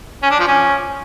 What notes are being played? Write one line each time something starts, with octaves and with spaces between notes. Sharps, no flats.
C#4
D4
F3
C#4